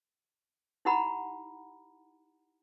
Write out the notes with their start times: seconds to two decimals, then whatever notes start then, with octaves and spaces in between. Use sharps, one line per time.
0.85 D#4 E4 G4 F#5 A#5 B5